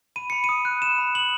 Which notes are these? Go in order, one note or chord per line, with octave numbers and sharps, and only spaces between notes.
B5 D#7
B5 C#7
D#7
D#6
F#6
B5 E7
B5
D#6 F#7